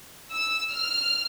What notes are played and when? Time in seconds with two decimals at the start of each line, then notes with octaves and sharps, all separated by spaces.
0.32 E6
0.73 F6